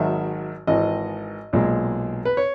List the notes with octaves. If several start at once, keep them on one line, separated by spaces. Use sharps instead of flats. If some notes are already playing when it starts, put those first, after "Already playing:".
Already playing: G#1 G#2 D#3 F#3 E5
G#1 G#2 E3 D#5
B1 A#2 G#3
B4
C#5